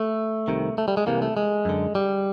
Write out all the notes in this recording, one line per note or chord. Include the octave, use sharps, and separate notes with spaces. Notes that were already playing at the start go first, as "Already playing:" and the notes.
Already playing: A3
C2 C3 D#3
A3
G3
G#3
C2 C3 E3 A#3
A3
G#3
F#2 D3
G3